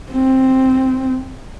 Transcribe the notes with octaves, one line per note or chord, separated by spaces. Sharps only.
C4